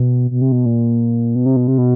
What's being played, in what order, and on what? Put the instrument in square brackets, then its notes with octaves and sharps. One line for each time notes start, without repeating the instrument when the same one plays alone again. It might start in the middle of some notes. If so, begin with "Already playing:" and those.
Already playing: [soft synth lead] B2
B2
C3
B2
A#2
B2
C3
B2
C3
B2